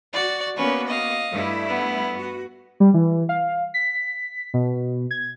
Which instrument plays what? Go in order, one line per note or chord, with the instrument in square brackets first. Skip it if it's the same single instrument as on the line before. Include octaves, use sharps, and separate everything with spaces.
[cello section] F#4 [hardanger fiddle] D5
[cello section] A#3 B3 F#4 [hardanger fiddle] C#4 B4
[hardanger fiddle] D#5 F5
[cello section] G2 A3 E4
[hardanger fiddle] B3
[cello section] F#4
[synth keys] G3
E3
F5
B6
B2
G#6